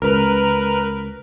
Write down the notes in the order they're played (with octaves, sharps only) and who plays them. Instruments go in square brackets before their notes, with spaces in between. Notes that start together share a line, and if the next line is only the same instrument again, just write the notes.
[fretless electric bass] C#2 [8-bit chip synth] A#4 B4 F6